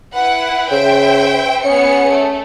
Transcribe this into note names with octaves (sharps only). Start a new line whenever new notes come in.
E4 B4 F#5
C#3 C5 E5 G5
B3 C#4 G#4 C#7
A3